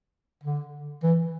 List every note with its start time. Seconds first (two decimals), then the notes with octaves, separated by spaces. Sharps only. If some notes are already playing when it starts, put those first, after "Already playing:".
0.44 D3
1.03 E3